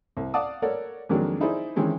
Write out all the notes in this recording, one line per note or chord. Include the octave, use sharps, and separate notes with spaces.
C2
D5 F5 F#5 A5 D6 D#6
A4 A#4 C#5 D5 F#5
F2 D#3 F#3 G#3 A#3 D4
D#4 E4 G#4 C5 D5
C3 D#3 E3 G#3 C4 C#4